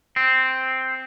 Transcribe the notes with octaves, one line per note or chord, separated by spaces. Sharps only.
C4